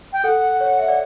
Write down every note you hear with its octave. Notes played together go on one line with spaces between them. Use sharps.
G5
A4 F#5
C#5
E5
D5